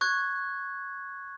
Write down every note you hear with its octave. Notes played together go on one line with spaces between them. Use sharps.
C#6 F#6 G#6